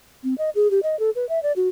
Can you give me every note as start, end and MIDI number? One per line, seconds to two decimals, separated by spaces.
0.24 0.34 60
0.38 0.50 75
0.55 0.70 68
0.71 0.83 67
0.83 0.99 75
0.99 1.10 69
1.15 1.28 71
1.29 1.42 76
1.43 1.52 74
1.56 1.69 66